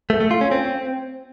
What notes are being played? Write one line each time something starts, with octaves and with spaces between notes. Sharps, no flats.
A3
A3
F4
C#4
C4